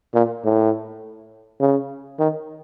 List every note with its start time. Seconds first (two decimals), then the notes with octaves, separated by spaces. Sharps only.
0.14 A#2
0.44 A2
1.60 C#3
2.19 D#3